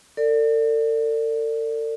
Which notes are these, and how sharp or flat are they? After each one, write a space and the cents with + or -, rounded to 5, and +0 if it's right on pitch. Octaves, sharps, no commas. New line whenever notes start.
A4 +45 D5 +0